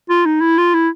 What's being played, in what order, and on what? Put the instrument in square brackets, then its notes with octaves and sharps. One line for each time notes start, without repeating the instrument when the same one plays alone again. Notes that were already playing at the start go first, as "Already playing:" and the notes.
[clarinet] F4
D#4
E4
F4
E4